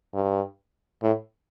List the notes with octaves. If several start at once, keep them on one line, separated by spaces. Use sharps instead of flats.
G2
A2